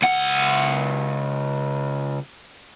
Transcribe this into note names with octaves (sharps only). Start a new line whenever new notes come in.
C#2 F#5